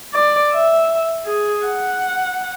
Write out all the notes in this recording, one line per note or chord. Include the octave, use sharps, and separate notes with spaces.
D5
E5
G#4
F#5